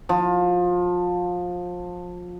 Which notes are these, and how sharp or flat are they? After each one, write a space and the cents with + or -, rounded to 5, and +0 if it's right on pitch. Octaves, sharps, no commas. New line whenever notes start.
F3 +25